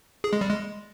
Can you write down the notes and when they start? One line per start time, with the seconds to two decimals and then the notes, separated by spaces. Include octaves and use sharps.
0.24 G#4
0.33 G#3
0.41 G3
0.50 G#3